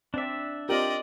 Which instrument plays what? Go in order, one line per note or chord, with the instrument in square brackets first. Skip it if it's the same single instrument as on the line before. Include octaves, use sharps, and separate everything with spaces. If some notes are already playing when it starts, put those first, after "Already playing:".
[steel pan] C4 D5 [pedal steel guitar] D4 E5
[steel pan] C4 F4 A#4 [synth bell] G4 G5 F#7 [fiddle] D5 D#5